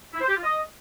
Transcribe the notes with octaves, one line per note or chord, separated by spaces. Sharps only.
E4
C5
G4
F4
D#5